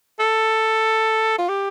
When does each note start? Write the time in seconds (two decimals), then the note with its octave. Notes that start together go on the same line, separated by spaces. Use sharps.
0.20 A4
1.38 F4
1.48 G4